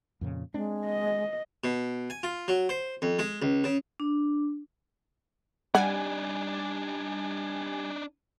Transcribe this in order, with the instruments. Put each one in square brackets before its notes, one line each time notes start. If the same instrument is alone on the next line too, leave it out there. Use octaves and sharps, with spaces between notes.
[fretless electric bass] F2 A#2 C#3
[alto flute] G#3 [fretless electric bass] C4 D4
[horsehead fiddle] D#5
[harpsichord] B2
G#5
F4
F#3
C5
F2
G#3
C#2
C#3
[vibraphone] D4
[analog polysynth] G3 G#5 [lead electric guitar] D4 D#4 [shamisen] F#5